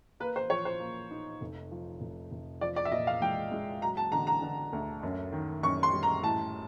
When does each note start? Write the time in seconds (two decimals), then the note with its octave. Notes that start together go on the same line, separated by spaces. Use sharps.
0.20 A#3 B4
0.36 C5
0.50 F3 C#5
0.65 C5
0.80 A#3
1.11 D#4
1.41 F1
1.71 F3
2.01 F1
2.32 F1
2.61 F3 D5
2.76 D5
2.85 E5
2.92 A#2 D#5
3.07 F5
3.22 G#3 G5
3.52 G#3
3.82 F#3 A#5
3.97 A5
4.12 D3 A#5
4.27 A#5
4.42 D3
4.73 D2
5.03 F#2
5.32 D#3
5.63 F#2 C#6
5.83 C6
5.93 G3
6.03 A#5
6.23 A2 A5